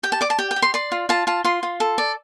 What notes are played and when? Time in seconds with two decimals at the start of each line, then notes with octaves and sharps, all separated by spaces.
0.03 G4 G5
0.12 A5
0.21 D5 D6
0.30 A5
0.39 G4 G5
0.51 G5
0.56 G4
0.62 C6
0.74 D5 C6
0.92 F4
1.09 F4 A5
1.27 F4 A5
1.45 F4 C6
1.63 F4
1.80 A4
1.98 D5